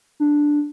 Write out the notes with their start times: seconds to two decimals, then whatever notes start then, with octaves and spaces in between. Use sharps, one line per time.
0.20 D4